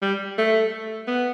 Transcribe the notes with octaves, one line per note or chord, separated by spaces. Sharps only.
G3
A3
B3